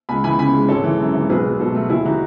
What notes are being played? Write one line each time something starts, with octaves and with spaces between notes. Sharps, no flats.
C#2 G#5 B5
E3 G#5 B5
C#3 G#5 B5
G#3
G#1 A4 C#5
E3
F#2
G#1
B1 G#4 B4
F#3
B2 F#4 A4
A3
D#2 E4 G#4
E3 D#4 F#4